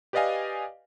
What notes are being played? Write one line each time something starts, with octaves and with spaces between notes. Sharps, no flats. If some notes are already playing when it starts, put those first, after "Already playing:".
G4 B4 D5 D#5 F5 G#5